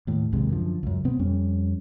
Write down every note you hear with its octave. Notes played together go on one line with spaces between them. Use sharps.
D#2 A2
A#1 D#2 C3 G#3
F#2 D3 F3
C#2 F#2
B2 B3 C4
F2 G3 C#4